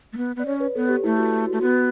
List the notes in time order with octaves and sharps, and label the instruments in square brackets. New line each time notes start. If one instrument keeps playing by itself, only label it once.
[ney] A3
B3
[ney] B3 [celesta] D5
[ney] C#4 [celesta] C#5
[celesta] B4
[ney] B3 [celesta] A4
[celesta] G4
[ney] A3 [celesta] E4
[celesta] F#4
F#4
[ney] A3
[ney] B3 [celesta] F#4